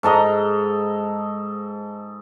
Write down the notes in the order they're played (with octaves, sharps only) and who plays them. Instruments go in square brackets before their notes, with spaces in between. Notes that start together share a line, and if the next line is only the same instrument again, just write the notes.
[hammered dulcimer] G#2 A4 D#5 A#5